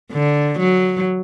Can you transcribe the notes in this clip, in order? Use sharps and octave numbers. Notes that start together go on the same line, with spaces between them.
D3
F#3